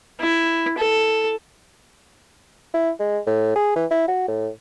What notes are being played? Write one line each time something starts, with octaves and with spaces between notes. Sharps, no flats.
E4
A4
E4
G#3
A2
G#4
E3
E4
F#4
A2